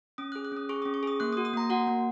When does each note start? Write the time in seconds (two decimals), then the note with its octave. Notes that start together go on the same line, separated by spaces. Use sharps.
0.18 C#4 D#6
0.32 G#4 F#6
0.45 F#6
0.52 C#4 D#6
0.69 G#4 C#6
0.82 C#4 D#6
0.94 C#6
1.03 G#4 D#6
1.20 A#3 F#6
1.33 D#6
1.37 F#4
1.45 D#6
1.54 A#3 A#5
1.70 F#4 F#5
1.87 A#3